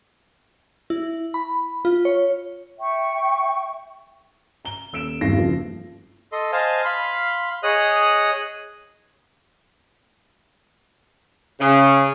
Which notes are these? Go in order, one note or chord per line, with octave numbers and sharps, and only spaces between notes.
E4
B5
F4
C#5
E5 G5 C#6
A#5 G7
D#1 E6 D7 E7
G#1 E2 G2 A#6 C7
F#1 F3
A4 D#5 C6
C5 D#5 F5 G#5 A5
F5 B5 C6
G#4 C#5 D#5 D#6 F#6
C#3